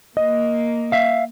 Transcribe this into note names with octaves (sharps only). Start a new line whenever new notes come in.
A#3 D#5
E5 F5